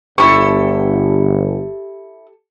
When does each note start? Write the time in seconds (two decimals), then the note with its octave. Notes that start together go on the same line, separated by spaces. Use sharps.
0.18 G1 E4 G4 A4 C#6